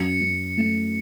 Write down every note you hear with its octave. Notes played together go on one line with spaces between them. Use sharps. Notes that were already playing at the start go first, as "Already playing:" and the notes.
Already playing: F#2 C#7
F#2
A3